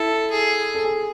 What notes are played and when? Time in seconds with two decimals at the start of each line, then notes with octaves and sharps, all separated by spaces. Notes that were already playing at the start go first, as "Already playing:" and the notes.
Already playing: E4 A4
0.31 G#4
0.75 A4
0.85 G#4